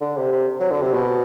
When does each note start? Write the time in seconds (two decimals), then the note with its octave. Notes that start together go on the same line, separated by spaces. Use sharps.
0.01 D3
0.17 C3
0.33 C3
0.60 F#3
0.71 D3
0.82 C3
0.93 B2